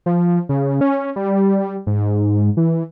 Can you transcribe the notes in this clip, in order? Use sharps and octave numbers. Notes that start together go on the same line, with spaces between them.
F3
C#3
C#4
G3
G#2
E3